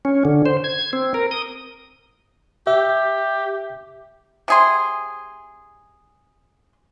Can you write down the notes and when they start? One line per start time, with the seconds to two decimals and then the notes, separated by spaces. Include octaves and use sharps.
0.05 C#4
0.25 D3
0.46 C5
0.64 G#6
0.93 C4
1.14 A#4
1.31 D#6
2.67 G4 E5
4.48 C3 G#4 C6